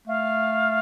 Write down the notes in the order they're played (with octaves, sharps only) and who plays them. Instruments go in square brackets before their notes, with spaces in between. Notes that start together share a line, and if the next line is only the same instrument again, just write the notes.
[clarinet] A3 [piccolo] F5